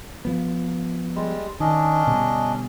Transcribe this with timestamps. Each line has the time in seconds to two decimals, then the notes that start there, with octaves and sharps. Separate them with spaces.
0.25 F3 B3
1.16 G3 G#3
1.60 D#3 C#4 D4 D#5
2.07 B2 D3 G3